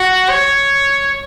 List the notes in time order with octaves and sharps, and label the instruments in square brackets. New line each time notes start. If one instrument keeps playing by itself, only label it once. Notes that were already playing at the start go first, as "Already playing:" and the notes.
Already playing: [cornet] F#4
C#5